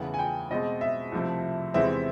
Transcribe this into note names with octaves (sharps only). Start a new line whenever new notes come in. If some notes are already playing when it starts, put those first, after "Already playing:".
Already playing: E2 C#3 E3 A3 F#5
G#5
G5
B2 G#3 C4 D#5
E5
C2 C3 F3 A3
E2 C3 E3 G#3 C4 E5